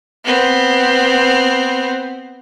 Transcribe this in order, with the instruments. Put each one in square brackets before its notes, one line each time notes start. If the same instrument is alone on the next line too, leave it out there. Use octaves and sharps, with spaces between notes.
[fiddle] B3 C4